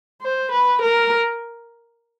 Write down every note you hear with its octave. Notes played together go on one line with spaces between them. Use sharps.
C5
B4
A#4